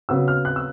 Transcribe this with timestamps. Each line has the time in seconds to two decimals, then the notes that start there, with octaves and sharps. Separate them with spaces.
0.09 C#3 F#3 B3 E6
0.28 F6
0.45 F#6
0.56 E6